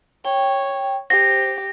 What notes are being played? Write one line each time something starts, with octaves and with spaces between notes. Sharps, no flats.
C#5 G5
G4 C5 A#6